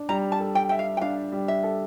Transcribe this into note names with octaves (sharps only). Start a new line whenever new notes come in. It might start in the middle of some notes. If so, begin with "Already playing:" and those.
Already playing: D4
G3 A#5
A5
A4
G5
E5 G5
F5
G5
D4 F5
G3
E5
A4